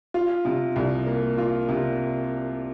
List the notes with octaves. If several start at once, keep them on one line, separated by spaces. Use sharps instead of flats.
F4
C3
C2
A#3
F4
C3